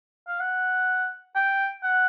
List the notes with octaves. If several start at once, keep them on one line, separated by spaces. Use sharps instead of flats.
F5
F#5
G5
F#5